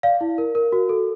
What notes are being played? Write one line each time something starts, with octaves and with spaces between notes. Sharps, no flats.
D5 F5
E4
A#4
A#4
F#4
A4